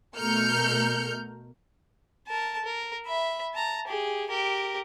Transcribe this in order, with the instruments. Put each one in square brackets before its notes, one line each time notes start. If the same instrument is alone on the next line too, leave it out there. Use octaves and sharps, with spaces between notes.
[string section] B2 A3 A#4 F6 G6 C#7
[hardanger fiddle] A#4 A5
A#4
E5 B5
A5 A#5
G4 G#4
G4 A#4